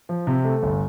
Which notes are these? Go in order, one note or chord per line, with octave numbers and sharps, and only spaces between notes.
F3
C3
A3
G1